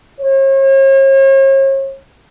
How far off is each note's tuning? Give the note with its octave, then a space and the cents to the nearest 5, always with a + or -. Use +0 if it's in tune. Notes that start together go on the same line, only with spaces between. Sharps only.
C#5 -45